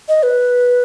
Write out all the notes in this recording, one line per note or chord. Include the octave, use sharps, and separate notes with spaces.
D#5
B4